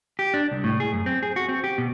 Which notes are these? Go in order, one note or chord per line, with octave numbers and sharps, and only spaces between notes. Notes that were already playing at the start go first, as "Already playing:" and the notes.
G4
D4
C2
A2
G#4
F#2
C4
G#4
F#4
C4
G4
B2